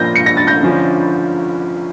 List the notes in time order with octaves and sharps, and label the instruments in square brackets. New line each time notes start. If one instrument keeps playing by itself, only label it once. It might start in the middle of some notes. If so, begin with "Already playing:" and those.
Already playing: [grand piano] A#2 F3 A#3 D4 F4 [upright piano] G6 A#6
[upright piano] C#7
A#6
A6
G6 A#6
[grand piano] D3 F3 C#4